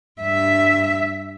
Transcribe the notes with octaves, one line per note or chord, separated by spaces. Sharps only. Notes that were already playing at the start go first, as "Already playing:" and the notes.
G2 E5